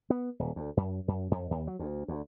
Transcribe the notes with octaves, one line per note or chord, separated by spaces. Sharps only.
B3
D#1
D2
F#2
F#2
F2
D#2
F#3
D2
D2